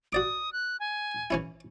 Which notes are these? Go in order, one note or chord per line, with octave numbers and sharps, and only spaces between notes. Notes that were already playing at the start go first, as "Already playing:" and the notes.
F#4 D5 D6 D#6
F#6
G#5
E3 C#4 E4